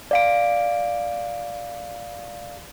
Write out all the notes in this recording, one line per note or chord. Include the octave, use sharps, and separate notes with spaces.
D5 F5 D7